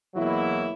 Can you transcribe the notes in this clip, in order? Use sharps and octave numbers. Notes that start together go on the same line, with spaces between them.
E2 B2 F#3 A#3 E4